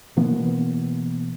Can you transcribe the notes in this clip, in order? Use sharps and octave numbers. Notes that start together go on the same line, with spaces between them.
B2 E3 A#3 B3